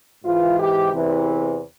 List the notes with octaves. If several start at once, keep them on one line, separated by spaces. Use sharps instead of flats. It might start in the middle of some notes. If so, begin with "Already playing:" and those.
G#2 E3 F4
G4
E2 C3 E3